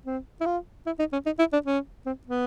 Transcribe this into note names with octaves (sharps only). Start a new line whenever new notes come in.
C4
E4
F4
E4
D#4
C#4
D#4
E4
D4
C#4
C4
B3